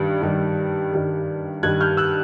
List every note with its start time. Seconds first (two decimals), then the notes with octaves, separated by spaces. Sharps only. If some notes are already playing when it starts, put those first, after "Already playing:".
Already playing: G2 D#3 G3
0.22 G2 D#3 G3
0.93 G2 D#3 G3
1.63 G2 D#3 G3 F#6 G#6
1.80 F6 G6
1.97 E6 F#6